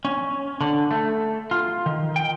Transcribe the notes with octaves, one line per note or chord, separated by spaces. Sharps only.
C#4
D3
A3
F4
D#3
G5